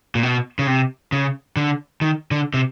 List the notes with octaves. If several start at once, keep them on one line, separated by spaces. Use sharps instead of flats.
A#2
B2
C#3
C3
C#3
D3
D#3
D3
C3